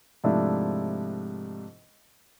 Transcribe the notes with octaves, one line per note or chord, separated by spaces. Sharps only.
G#2 C3 F3 A3 D4 E4